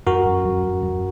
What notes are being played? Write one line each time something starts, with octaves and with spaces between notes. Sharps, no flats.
F#2 F#4 A#4
F#2
F#2
F#2
F#2